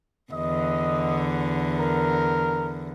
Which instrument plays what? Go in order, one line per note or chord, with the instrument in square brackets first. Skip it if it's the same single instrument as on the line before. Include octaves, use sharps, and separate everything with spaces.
[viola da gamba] E2 D3 [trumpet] D#5
[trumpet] A#4